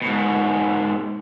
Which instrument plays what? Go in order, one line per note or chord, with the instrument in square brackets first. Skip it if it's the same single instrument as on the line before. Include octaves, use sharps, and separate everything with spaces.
[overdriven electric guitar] G#2 B2